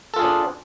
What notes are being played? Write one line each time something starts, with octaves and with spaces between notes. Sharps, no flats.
D4 F4 G#4 A4